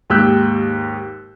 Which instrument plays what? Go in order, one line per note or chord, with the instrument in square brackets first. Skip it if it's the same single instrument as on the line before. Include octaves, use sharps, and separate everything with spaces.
[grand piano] D#2 G#2 G4 E6 F#6 G6